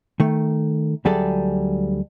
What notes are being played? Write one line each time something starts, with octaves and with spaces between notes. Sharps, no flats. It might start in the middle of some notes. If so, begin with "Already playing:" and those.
D#3 A3
D2 F#3 G3 G#4 A4 D5